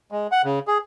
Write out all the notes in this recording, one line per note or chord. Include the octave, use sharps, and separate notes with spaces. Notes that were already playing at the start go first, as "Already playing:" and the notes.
G#3
F#5
C#3
G#4